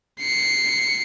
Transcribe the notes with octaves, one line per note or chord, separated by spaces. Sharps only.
C7 C#7